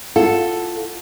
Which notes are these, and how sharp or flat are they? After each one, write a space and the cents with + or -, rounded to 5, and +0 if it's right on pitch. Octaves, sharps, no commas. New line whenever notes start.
F4 +0 A4 +0 F#5 +0